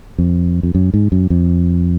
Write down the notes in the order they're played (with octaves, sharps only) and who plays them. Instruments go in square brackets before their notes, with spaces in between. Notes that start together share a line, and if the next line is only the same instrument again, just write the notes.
[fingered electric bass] F2
F2
F#2
G#2
F#2
F2